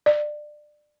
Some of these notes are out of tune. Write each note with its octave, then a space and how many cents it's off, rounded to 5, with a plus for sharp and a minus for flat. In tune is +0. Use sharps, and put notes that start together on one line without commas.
D5 +20